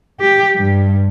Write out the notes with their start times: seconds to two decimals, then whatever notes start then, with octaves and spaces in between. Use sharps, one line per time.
0.20 G4
0.56 G2